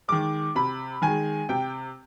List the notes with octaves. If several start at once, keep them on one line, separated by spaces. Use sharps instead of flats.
D#3 G#3 D6
C3 B5
D#3 G#3 G#5
C3 G5